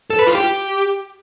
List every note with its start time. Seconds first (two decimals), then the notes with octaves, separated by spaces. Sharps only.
0.10 A4
0.19 B4
0.27 F4
0.35 G4